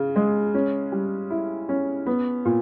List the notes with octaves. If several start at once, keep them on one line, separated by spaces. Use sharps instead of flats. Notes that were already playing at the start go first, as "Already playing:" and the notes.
Already playing: C#3
G#3
C#4
G3
E4
C#4
B3
A#2